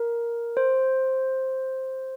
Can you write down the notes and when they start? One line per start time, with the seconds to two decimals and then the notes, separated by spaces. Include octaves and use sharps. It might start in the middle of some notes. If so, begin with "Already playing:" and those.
Already playing: A#4
0.57 C5